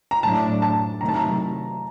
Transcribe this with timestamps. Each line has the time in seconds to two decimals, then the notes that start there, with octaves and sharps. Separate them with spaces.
0.11 A#5
0.23 A2 F#3 A3 D4 A5
0.62 A5
1.01 C3 D#3 F#3 A3 A#5
1.09 A5
1.16 A#5